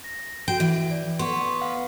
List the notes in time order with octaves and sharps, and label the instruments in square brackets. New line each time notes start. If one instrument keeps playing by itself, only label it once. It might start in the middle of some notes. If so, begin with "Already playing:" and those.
[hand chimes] A#6
[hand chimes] F#4 [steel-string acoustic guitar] G5
[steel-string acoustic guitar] E3
[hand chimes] D5
[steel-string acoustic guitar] B3 [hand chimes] C6 C#6
[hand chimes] F5 F#5